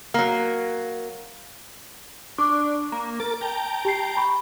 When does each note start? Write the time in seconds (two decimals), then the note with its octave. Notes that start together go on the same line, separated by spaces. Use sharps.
0.14 F#3 A#3
2.38 D4 C#6 D6
2.92 A#3
3.20 A#4 A6 D7
3.41 G5 A5 A#5
3.85 G4 C7
4.17 B5 C#6